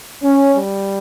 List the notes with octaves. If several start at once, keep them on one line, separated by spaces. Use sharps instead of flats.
C#4
G3